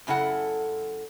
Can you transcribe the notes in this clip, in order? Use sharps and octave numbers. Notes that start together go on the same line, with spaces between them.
F#2 C#3 E4 A4 F#5